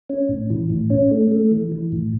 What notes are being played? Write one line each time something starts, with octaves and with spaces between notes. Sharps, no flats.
C#4
A2
E3
A2
C#4
A3
A3
E3
E3
A2